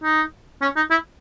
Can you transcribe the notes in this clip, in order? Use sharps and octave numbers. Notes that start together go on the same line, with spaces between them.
D#4
C#4
D#4
E4